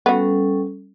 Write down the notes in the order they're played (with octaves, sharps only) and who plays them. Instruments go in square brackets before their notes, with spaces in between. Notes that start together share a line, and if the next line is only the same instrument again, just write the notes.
[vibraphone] G3 C#4 A4 [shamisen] B3 F#4